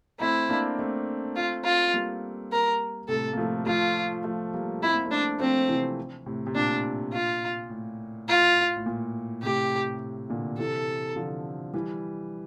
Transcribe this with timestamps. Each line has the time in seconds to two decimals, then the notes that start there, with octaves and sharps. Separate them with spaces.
0.20 A3 C4 E4
0.49 A#3 D4
0.79 A3 C4
1.36 F4
1.64 F4
1.94 G3 A#3
2.52 A#4
3.09 A2 C3 A4
3.33 A#3
3.37 F3 A3
3.66 F3 A3 F4
4.24 F3 A3
4.54 G3 A#3
4.82 C4 E4
4.94 A#3
5.06 A3 C4
5.11 D4
5.39 F3 A3 C4
5.69 C3 E3
6.26 A2 C3
6.47 C3
6.55 A#2 D4
7.13 F4
7.70 A2
8.29 F4
8.76 A2
8.86 A#2
9.43 A2 C3 G4
10.30 A#2 D3
10.58 C3 E3 A4
11.16 D3 F3
11.74 E3 G3